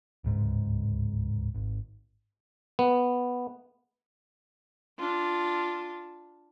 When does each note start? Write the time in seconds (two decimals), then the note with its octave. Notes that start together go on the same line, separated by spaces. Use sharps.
0.24 D1 C#2 G#2
1.54 G#1
2.79 B3
4.99 D4 F4